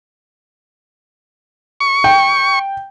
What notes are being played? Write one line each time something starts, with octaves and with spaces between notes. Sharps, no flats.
C#6
G5